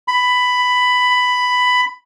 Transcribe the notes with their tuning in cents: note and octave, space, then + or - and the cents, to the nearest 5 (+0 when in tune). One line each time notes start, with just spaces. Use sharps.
B5 +10